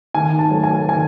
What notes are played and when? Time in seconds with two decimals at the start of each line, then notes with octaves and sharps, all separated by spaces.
0.14 D#3 G#5
0.39 A5
0.51 F#3 A3
0.63 G#5
0.88 D#3 G#5